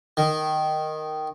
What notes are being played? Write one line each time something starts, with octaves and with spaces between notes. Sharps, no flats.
D#3